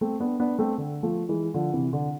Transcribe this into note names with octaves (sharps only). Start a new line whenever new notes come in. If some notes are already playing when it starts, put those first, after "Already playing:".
A3 C4
B3 D4
B3 D4
A3 C4
D3
F3 A3
E3 G#3
D3 F3
C3 E3
D3